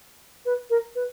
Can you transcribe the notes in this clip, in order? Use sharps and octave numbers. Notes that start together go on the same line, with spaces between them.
B4
A#4
B4